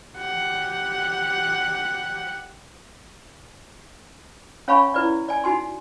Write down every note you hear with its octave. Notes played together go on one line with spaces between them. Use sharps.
G4 F#5
C#4 C#5 F5 G#5 B5 C#6
E4 B4 D5
D5 G#5
D#4 F#4 G#5 C6